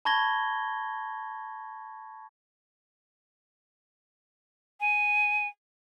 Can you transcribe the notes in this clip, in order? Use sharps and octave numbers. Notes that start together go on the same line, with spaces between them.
A5 B5 C#6 G#6 A#6 G7
G#5